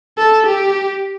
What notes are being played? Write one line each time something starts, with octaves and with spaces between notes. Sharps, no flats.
A4
G4